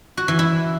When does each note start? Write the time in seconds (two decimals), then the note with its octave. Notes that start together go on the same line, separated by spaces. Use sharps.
0.17 F#4
0.28 E3
0.39 E4